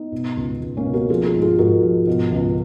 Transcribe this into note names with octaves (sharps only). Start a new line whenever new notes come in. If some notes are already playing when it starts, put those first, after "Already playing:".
Already playing: B3 D#4
B2
C#2
C#2
A#3 C#4
B2
F#4 A#4
F3 F4 G#4
F4 G#4
G#2
F4 G#4
G#2 F#4 A#4
F3
B2
C#2